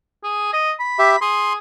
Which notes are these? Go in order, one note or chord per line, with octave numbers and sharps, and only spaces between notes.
G#4
D#5
B5
G4 E5
G#4 C6